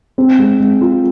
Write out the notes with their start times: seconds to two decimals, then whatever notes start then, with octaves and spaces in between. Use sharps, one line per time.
0.18 C4
0.39 G#3
0.60 G#3
0.81 F4